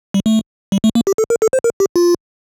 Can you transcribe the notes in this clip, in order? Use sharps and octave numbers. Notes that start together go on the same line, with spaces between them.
G3
A3
G3
A3
A#3
G4
A4
A#4
A4
C5
A#4
G4
F4